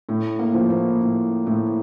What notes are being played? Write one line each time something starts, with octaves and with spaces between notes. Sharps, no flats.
A2
A#3
F3
A#3
A2
A2